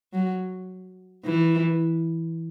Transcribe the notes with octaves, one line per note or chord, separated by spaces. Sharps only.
F#3
E3